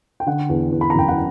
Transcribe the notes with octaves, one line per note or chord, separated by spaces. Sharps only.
G5
D3 F#5
E2
E2
B5
A#5
F#1 G5
F#5